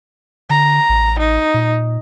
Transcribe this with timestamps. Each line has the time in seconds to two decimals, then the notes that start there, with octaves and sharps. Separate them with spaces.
0.50 D3 A#5
0.89 A1
1.19 D#4
1.54 A#2